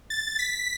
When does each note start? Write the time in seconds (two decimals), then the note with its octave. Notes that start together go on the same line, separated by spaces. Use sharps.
0.10 A6
0.39 B6